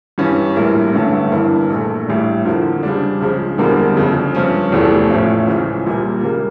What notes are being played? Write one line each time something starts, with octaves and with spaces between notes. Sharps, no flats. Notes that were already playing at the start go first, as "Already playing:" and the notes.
G2 E3 G3 C#4
A#1 A2 G3 A#3 E4
A1 G2 D3 A3 C#4
G1 G2 E3 A#3 E4
A#1 A#2 A3
A1 A2 G3 D4
F2 D3 F3 A#3 E4
C#3 G3 D4
C#2 C#3 F3
E1 E2 D3 G3 A#3
G1 F2 C#3
G2 F3 C#4
F1 E2 E3 A3
A1 A2 F3 C#4 F4
C#2 C#3 E3
A#1 A#2 G3 A#3
C#3 G3 A#3